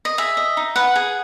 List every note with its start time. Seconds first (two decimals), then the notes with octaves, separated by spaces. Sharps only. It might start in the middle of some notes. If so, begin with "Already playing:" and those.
0.05 D#5
0.18 G#4 E5
0.37 D#5
0.57 D#4
0.76 B4 F#5
0.96 G#4